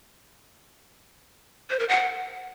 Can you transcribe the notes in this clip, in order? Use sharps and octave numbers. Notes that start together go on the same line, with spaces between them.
C5
A#4
F#5